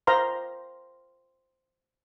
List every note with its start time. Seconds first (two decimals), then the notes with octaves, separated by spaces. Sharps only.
0.07 C5 F5 A#5 C6